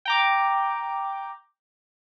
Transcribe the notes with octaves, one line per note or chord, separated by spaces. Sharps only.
G5 A#5 D6